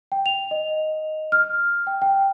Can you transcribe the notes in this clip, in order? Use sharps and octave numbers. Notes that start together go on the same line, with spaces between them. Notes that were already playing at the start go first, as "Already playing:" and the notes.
G5
F7
D#5
F6
G5
G5